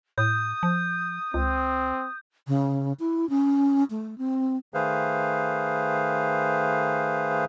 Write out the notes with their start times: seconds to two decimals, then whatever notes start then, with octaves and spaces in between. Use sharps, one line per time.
0.18 A2 D#6 G6
0.63 F3
1.34 C#2 C4
2.48 C#3
3.00 E4
3.29 C#4
3.90 A3
4.18 C4
4.74 D#3 A3 G#4 B4 C5 F5